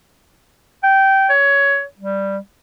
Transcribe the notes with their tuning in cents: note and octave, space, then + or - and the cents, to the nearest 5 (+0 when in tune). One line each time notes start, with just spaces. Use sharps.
G5 -15
C#5 +15
G3 +0